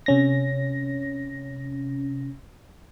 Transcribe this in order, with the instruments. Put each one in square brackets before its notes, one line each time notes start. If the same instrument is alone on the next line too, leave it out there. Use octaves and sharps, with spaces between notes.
[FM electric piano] C3 C#4 A#6